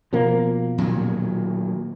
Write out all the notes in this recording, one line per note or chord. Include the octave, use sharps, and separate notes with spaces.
B2 F3 A#3
A#2 D#3 F#3